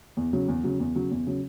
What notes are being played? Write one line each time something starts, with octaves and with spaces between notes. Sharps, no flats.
E2
C#3 F#3
E2
C#3 F#3
E2
C#3 F#3
E2
C#3 F#3